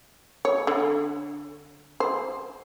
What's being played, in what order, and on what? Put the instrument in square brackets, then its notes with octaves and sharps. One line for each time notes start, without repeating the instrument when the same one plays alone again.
[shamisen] C#5
D3
C5